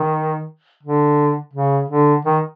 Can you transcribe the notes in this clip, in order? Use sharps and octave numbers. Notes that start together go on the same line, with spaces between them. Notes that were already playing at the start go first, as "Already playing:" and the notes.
Already playing: D#3
D3
C#3
D3
D#3